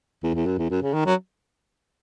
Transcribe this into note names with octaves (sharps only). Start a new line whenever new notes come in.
E2
E2
F#2
E2
F#2
C#3
D#3
F#3